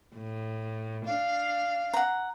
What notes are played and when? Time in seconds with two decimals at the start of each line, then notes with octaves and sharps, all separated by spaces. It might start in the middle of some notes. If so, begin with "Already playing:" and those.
0.14 A2
1.06 D4 F5
1.94 F#5 A#5